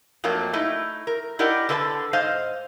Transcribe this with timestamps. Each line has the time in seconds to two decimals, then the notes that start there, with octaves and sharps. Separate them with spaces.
0.24 F2 F#3 A3 A#3 D4
0.53 A3 D#4 E4
1.07 A#4
1.39 E4 G4 A#4 D5 D#5 F#5
1.69 D3 A4 B4 D#5 A5
2.13 G#2 C5 D#5 F5